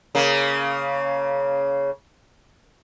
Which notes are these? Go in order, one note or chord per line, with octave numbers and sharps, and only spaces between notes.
C#3 A#3